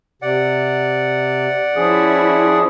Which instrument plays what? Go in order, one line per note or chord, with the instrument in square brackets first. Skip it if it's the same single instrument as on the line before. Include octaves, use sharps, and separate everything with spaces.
[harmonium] C3 [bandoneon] D5 F#5
[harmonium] F3 G#4 [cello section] C#4 E4